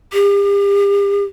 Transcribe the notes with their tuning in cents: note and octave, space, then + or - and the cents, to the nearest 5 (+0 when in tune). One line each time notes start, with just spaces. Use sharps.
G4 +40